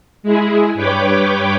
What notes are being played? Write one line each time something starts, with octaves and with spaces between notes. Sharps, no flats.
G#3 E4 G#4
G2 B4 C#5 G5 D6